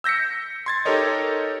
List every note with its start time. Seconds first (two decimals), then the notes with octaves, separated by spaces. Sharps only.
0.04 E6 G6 A#6 B6 C#7
0.66 C6 G#6 A6
0.85 D#4 G4 A4 A#4 C#5 D#5